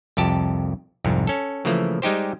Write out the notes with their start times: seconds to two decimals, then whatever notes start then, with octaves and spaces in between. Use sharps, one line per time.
0.17 C2 F2 G4 A5
1.04 C2 F2 G#2
1.27 C#4 A4
1.65 C#3 E3 F3 A3 A#3
2.02 G3 G#3 D#4 G4 C5